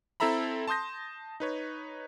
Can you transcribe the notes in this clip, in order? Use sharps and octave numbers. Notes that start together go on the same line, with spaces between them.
C4 E4 A4 E5 A#5 B5
A5 C6 D#6 G6 A#6
D#4 B4 C#5